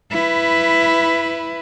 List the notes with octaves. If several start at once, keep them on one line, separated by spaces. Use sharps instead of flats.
E4 B4